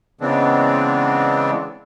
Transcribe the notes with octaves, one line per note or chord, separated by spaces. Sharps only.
C#3 E3 G#3 B3 C4 D4